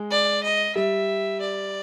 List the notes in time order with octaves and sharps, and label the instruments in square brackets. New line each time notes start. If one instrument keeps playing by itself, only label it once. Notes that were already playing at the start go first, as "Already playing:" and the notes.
Already playing: [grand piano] G#3
[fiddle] D5
D#5
[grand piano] G3 [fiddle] E5
[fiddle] D5